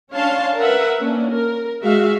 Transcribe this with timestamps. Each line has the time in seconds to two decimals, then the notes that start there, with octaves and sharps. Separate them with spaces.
0.13 C#4 D4 C#5 F5 A5 C6
0.58 A#4 B4 E5 F#5
1.00 A#3 C#4 D4
1.30 A#4
1.83 G#3 F#4 E5 F5